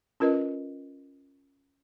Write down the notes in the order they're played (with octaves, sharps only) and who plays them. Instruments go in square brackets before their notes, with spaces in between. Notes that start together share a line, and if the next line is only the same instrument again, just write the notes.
[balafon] C#4 F4 A#4 B4 D#5